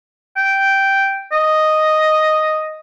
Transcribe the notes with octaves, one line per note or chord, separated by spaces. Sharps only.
G5
D#5